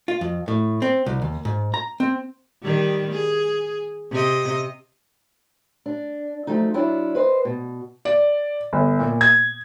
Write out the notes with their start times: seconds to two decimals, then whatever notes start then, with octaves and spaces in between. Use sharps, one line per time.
0.08 F4
0.21 F2
0.48 A2
0.82 C4
1.06 C2
1.22 D#2
1.45 G#2
1.74 A#5
2.00 C4
2.62 D#3 G3
3.12 G#4
4.11 C3 D#5
5.86 D4
6.47 F3 F#3 A3 D#4
6.74 F#3 D4 E4 F4 C#5
7.15 B4 C5 D#5
7.45 B2
8.05 D5
8.73 G1
8.99 A#2
9.21 G#6